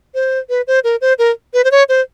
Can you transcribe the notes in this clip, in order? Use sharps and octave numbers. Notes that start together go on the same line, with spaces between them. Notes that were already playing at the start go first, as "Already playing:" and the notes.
C5
B4
C5
A#4
C5
A#4
B4
C5
C#5
C5